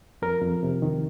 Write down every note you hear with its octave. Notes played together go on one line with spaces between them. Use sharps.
F2 A#4
F2
C3
D#3